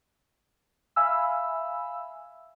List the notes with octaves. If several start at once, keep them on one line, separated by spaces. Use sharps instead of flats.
E5 F5 G#5 B5 E6